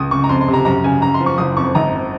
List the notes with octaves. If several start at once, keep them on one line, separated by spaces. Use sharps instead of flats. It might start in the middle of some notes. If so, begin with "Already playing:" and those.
Already playing: C#2 D#6
C#3 C#6
A#5
F2 C6
C6
C3
A#5
F#2 A#5
C#3 G#5
F#2 A#5
C6
F3
C#6
F#1 D#6
F2 C#6
G#1 A#5